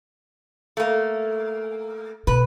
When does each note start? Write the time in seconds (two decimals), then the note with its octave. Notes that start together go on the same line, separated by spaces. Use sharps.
0.77 A3 A#3
2.27 B2 B4